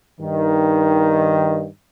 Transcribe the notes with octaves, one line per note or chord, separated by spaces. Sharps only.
G2 D#3